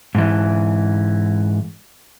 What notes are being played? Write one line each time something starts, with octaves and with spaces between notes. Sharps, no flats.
G#2 E3